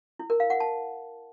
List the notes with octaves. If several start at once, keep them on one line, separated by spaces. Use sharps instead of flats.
E4
A#4
F5
F#5
A5